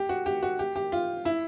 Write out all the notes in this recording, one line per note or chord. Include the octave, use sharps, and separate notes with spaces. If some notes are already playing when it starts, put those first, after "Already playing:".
Already playing: G4
F#4
G4
F#4
G4
G4
F4
E4